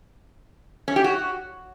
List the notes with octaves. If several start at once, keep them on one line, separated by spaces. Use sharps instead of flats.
C#4
G4
F#4